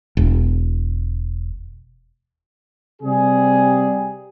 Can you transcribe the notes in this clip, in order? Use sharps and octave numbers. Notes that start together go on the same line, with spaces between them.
E1
C3 G3 G#4